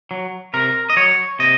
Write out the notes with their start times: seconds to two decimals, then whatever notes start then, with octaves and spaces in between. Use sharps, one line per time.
0.11 F#3
0.54 C3 A#4
0.90 D#5
0.96 F#3 C#5
1.39 C3 D#5